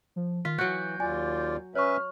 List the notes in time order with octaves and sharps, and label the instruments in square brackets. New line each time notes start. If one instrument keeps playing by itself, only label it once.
[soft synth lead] F3
[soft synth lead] D#3 [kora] F4 [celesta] B6
[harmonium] E3 [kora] F#3 F#4 [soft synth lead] G6
[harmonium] D#2 F4 D5 [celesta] G#5
[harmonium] C#4 B4 E5 [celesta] C#5 C#6 [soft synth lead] F6